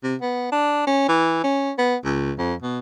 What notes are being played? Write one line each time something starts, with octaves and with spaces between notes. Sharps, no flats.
C3
B3
D4
C#4
E3
C#4
B3
C#2
F2
B2